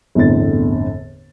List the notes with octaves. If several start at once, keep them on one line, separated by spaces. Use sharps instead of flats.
G1 E2 A2 D3 C4 A6